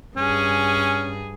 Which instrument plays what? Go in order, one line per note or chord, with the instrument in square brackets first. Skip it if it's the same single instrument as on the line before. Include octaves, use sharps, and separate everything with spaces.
[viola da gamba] G2 G#4 [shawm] C#4